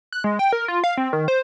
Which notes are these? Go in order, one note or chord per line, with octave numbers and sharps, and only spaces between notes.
F#6
G#3
G5
A#4
F4
F5
C4
D#3
C5